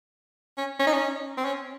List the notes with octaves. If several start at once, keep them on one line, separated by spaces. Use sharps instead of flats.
C#4
C#4
D#4
C#4
C4
C#4